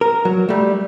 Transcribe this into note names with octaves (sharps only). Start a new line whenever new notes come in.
A#4
F#3
G3 A3